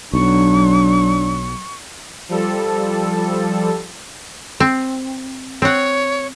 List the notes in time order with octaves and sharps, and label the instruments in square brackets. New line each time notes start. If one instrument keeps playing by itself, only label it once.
[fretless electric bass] B1 [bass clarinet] F#3 [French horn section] D4 [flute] C#6
[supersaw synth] F3 G3 A4
[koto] C4
[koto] C4 F#5 [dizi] C#5